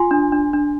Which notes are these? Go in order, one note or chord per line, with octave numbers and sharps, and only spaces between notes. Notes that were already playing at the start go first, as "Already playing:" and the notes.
Already playing: F4 G#5 C6
D4
D4
D4